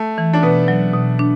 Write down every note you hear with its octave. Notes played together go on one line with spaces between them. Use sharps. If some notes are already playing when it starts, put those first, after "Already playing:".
Already playing: A3
E3
D4
B2 B3
F#3
B2
D4